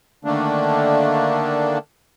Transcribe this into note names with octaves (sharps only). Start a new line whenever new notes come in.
D3 D#3 A3 A#3 D4